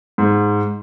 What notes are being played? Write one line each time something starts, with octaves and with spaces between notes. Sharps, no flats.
G#2